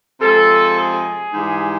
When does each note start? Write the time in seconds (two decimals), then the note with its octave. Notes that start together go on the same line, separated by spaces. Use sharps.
0.20 C3 F3 G#3 A4
0.76 G#4
1.33 G#2 E3 G3